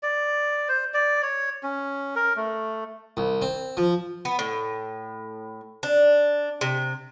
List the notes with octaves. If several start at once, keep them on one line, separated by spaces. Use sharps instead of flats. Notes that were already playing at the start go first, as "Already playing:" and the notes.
D5
C5
D5
C#5
C#4
A#4
A3
C2
C4
F3
B3
A2
D4
C3